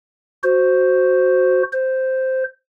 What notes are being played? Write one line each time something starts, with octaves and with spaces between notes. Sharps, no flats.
F#4 C5
C5